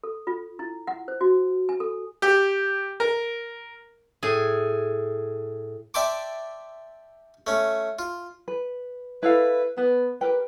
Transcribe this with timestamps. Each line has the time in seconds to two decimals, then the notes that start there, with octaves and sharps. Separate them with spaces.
0.04 A4
0.27 F4
0.59 E4
0.87 F#5
1.08 C5
1.21 F#4
1.69 G#5
1.80 A4
2.22 G4
3.00 A#4
4.23 A2 G#4
5.94 D5 E5 G5 A5 C6 D6
7.47 A3 C#4
7.99 F4
8.48 B4
9.23 E4 A4 B4 F5
9.77 B3 B4
10.21 G4 A#4 B4 G5